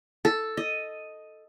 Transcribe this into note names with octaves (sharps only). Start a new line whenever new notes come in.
A4
D#5